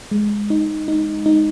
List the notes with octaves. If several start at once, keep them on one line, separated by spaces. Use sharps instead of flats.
G#3
D#4
D#4
D#4